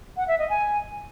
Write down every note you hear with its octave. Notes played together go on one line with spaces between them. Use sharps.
F#5
E5
D#5
G#5